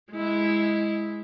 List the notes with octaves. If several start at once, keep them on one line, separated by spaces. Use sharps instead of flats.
G#3 E4